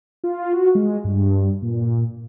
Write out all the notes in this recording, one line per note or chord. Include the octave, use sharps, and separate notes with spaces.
F4
F#4
G#3
G2
A#2